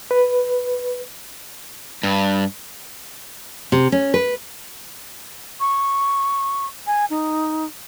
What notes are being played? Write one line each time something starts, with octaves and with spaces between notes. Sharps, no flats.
B4
G2
C3
C#4
B4
C#6
G#5
D#4